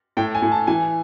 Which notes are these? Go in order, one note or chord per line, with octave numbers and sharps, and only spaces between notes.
A2 G5
G#5
A2
A5
E3 G#5